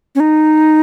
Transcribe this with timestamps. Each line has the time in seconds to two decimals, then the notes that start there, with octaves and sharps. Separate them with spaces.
0.15 C#4
0.20 D#4